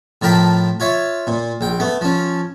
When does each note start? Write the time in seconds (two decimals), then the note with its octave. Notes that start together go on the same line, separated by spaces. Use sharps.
0.22 A2 F3 A#4 G5 A5 B5
0.80 F4 C#5 E5
1.27 A#2
1.61 A#1 G5
1.80 A3 B3
2.01 F3 C#4